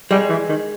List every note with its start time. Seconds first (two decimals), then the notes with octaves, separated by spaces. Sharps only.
0.11 G3 G#3
0.29 E3
0.49 D#3